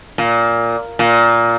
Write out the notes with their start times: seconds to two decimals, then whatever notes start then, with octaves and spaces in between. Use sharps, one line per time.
0.18 A#2
0.99 A#2